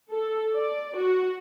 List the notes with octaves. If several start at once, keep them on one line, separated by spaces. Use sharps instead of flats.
A4
D5
F#4